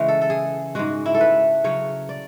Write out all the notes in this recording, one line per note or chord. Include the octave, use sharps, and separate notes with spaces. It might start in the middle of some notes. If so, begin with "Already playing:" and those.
Already playing: C#3 E3 G#3 C#5
A4
A4
G#4
G#2 G#3 F#4
E4
A4
B4
C#3 F#3 C#5
D5